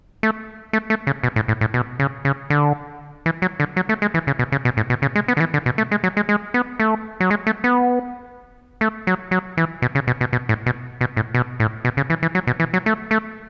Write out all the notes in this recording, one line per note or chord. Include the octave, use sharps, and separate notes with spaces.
A3
A3
A3
C#3
B2
A2
A2
A2
B2
C#3
C#3
D3
E3
F#3
D3
F#3
A3
G#3
E3
C#3
B2
C#3
B2
A2
B2
C#3
G#3
B3
D3
E3
D3
B2
A3
G#3
F#3
G#3
G#3
B3
A3
F#3
G#3
A3
B3
A3
F#3
F#3
E3
B2
C#3
B2
B2
B2
A2
B2
B2
A2
B2
A2
B2
C#3
E3
E3
F#3
B2
E3
F#3
A3
A3